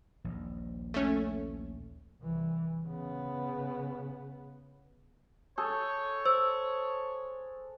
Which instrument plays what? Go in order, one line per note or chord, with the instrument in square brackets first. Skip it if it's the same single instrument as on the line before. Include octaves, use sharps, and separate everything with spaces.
[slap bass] A#1 D#2
[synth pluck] A3 C#4
[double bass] C2 E3
C#3 B3
[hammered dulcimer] G#4 A4 [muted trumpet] C#5 [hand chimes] G6
[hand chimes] C5 [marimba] E6